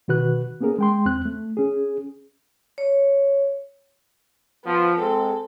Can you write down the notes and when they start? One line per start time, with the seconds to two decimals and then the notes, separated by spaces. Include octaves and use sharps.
0.08 B2 D#3 F#4 B4 F#6
0.61 A#3 B3 C#4 G#4 A#4
0.79 G#3 G5 C6
1.05 E2 C4 F#6
1.25 A3
1.57 C#4 G#4
2.78 C#5
4.65 F3 B3
5.00 G#3 C4 A4